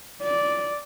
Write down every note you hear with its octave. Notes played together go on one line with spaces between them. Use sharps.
D5